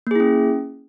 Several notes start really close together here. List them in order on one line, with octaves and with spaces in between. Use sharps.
A#3 G#4 E4 C#4